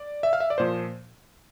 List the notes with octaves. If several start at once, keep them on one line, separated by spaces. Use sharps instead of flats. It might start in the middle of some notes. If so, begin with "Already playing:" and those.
Already playing: D5
E5
F5
E5
D5
A#2 F3 C5